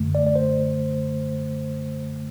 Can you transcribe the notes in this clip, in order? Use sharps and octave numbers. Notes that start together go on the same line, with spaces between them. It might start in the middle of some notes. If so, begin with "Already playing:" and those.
Already playing: F#2 D3 A3
D5
D5
C5